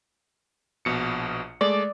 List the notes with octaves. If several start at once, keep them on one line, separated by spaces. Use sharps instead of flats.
A#1 B2 C#7
G#3 A3 D5